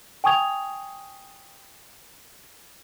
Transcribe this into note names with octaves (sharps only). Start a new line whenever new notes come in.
G5 G#5 C#6 D#6 G#6 F7